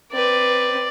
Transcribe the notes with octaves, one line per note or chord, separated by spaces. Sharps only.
C4 B4 D5